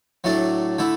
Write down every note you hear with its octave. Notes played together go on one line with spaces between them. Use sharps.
A2 F#3 A3 D4
D3 A3 E4